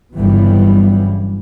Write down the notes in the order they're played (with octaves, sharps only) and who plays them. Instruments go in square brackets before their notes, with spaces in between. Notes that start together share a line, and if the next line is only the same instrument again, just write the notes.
[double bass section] G1 C#3 E3 F#3 G3 B3